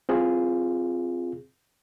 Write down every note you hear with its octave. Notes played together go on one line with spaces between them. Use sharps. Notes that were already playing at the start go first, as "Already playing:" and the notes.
C4 F4 G#4